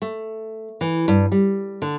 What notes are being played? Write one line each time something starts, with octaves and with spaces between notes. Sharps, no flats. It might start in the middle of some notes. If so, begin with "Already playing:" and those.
A3
E3
G2
G3
D3